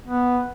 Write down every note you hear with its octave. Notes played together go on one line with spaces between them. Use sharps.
B3